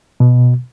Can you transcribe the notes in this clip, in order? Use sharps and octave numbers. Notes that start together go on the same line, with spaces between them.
B2